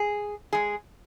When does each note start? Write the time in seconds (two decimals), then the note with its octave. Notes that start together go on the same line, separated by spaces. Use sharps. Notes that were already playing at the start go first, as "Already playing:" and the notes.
Already playing: G#4
0.53 G#3 G#4